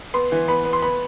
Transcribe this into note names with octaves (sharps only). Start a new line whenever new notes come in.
B3 C6
E3
B3 B5
B3
C6
B3 B5